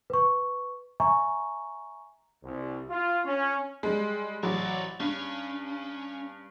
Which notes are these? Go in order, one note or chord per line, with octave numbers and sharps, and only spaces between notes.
B4 C#6
E5 G#5 A#5 C#6
C2
F4
C#4
G3 G#3
A1 F#3 C#5 D5
G2 C#4